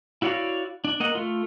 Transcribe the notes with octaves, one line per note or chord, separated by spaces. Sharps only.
E4 F#4 C#5 D5 F5
D4
A#3 D#5 F#5
A3 F4